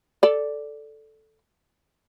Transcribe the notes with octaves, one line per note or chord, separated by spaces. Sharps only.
A4 D5